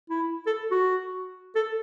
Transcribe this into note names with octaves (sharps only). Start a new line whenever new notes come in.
E4
A4
F#4
A4